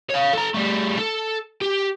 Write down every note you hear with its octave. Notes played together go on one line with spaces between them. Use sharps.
C#5 F5
A4 A#5
G3 A3
A4
G4